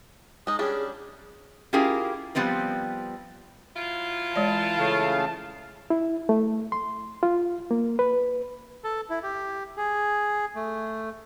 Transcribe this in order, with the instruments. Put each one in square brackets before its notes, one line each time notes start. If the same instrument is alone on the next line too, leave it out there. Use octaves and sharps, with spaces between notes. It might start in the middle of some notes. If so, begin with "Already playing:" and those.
[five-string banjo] G#3 D#4 [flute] D#6
[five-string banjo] G3 C#4 D4 [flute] G#4
[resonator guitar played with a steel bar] C#4 E4 F4 G4 G#4 A#4
F3 G3 B3 C4 B4
[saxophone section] F#3 E4 F4
[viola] E3 A5 [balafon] G#3 C#5 D5
[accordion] C#3 A3 F5
[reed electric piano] E4
A3
C6
F4
A#3
B4
[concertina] A4
E4
G4
G#4
A3